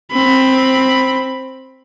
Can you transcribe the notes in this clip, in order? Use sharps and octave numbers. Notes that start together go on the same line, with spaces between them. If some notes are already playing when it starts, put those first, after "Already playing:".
C4 B5